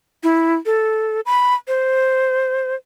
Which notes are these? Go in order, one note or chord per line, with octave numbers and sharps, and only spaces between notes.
E4
A4
B5
C5